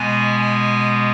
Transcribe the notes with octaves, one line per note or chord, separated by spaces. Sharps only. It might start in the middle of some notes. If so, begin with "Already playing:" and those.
Already playing: B2 G#3 B3 G#5
G#5